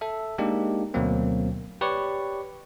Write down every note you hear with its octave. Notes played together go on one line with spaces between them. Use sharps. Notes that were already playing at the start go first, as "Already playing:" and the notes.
A4 E5
G#3 A#3 D4 D#4 G4
D2 B2 D3 F#3 A#3 C4
G4 B4 C#5 D5 C#6